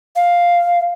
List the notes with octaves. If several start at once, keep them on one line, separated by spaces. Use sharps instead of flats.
F5